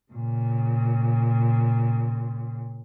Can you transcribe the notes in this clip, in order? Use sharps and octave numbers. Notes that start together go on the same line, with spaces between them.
A#2 C#3